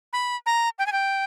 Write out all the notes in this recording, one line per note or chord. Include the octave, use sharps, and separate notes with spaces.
B5
A#5
G5
G#5
G5